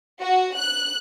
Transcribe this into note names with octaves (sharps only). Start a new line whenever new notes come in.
F#4
F#6